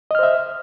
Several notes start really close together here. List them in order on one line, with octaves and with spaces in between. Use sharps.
D#5 F6 C5 E5